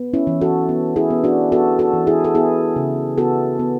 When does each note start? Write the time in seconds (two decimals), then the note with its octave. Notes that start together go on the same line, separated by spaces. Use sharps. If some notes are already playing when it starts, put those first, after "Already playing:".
Already playing: B3
0.13 C#4 E4
0.27 E3
0.41 F#4 A4
0.69 B3
0.96 E4 G#4
1.10 B3
1.24 D4 F#4
1.52 B3 F#4 A4
1.79 F#4 A4
1.94 E3
2.07 E4 G#4
2.24 A4
2.35 B3 E4 G#4
2.76 C#3
3.18 B3 F#4 A4
3.59 B3